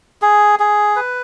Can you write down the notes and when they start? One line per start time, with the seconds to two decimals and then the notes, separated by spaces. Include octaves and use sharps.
0.22 G#4
0.59 G#4
0.96 B4